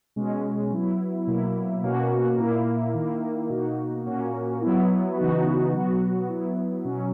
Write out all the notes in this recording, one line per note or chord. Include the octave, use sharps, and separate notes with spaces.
B2 G#3 C#4
F#3 B3 E4
B2 F#3 A#3 E4
B2 A#3 C#4 F#4
A#2 A#3 E4
D#3 A#3 E4
B2 A#3 D#4 F#4
A#2 A#3 C#4 F#4
F#3 B3 E4
C#3 E3 B3 D#4 F#4
B2 F#3 B3 F#4
F#3 B3 E4
B2 F#3 C#4